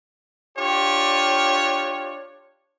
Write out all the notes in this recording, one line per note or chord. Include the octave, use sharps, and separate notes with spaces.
D4 F4 G4 C#5